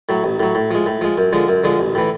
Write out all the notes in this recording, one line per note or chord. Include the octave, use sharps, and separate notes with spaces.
A2 F#3
A1
A2 F#3
A2
F3 G#3
A2
F3 G#3
F#2
D3 F3 G#3
F#2
D3 F3 G#3
A1
A2 E3